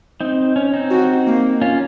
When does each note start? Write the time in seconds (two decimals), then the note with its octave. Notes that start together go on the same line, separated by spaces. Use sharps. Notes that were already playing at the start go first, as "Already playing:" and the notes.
0.20 C4 D#4
0.56 C#4
0.73 C4 D#4
0.91 F#4
1.27 A#3
1.61 C#4 F4